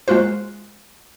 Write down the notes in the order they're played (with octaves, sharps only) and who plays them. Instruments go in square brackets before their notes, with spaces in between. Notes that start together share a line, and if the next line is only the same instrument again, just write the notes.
[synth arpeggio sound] G#3 A#3 F4 F#4 C5